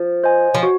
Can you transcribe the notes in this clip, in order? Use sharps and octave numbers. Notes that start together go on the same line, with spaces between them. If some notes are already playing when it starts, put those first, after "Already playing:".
Already playing: F3
C5 D#5 G#5
F3
F#4